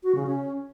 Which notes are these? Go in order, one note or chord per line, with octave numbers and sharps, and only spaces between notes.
F#4
C#3
C#4